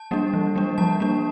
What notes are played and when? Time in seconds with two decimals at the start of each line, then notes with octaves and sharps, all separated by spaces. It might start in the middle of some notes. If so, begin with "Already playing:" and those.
Already playing: A5
0.11 G3 A#3 D4
0.33 E3
0.56 G3 A#3 D4
0.78 F3 A5
1.00 A#3 D4